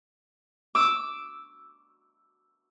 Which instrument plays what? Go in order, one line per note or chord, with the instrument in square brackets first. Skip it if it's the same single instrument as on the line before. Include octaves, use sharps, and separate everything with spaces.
[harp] D6 E6